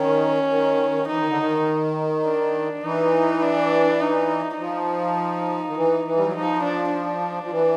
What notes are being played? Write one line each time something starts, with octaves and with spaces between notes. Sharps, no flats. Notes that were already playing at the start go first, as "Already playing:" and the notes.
Already playing: D#3 C#4
D#3
E3 D#4
D#3
D3
D#3
D4
E3 D#4
D4
D#4
F3 D#4
D#3
E3
E3
G3
F#3
F3 D#4
D4
D4
F3
E3